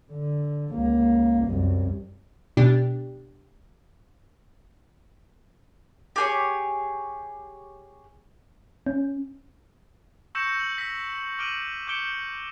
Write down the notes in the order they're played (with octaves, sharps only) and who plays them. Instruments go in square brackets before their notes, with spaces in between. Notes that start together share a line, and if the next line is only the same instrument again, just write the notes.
[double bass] D3
C#2 A#3
C2 F#2
[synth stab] B2 D4 G4
[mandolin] G4 G#4 C#5
[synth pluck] C#4
[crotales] C#6 E6 G6 A#6 C#7 E7
F#7
E6 A#6 B6
D6 F6 D7 D#7 F#7
D6 G6 C#7 D7 G7